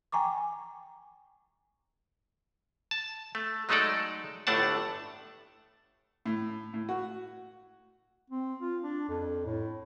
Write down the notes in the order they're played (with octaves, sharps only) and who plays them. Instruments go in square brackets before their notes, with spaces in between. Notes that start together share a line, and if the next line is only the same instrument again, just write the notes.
[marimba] G5 G#5 A#5 C#6 D6
[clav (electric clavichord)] A5
A3
F#3 G#3 A3 D#4 A4 D5
G1 A2 A3 D4 F#5 A5
[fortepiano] A2
A2
F#4
[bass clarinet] C4
F4
D4
F2
A2